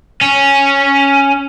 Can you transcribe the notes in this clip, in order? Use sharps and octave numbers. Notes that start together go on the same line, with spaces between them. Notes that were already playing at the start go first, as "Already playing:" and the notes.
C#4